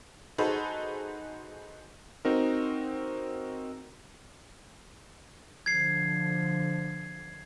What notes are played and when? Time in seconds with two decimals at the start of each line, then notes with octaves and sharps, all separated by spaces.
0.38 D#4 F#4 G#4 A4 B4 C5
2.25 C4 D#4 F#4 A#4
5.66 D3 F3 G#6 C7